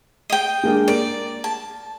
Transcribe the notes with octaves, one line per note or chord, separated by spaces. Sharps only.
D#5 G5
G#3 A#3 D4
A#4 D5 D7
A5